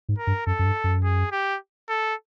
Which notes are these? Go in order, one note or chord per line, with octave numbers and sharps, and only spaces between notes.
G#2
A#4
G2
F#2 A4
F#2
G2
F#2
G#4
G4
A4